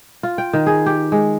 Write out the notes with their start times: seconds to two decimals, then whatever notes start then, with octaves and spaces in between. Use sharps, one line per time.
0.23 F4
0.38 G5
0.53 D#3
0.67 G#4
0.86 G4
1.12 G#3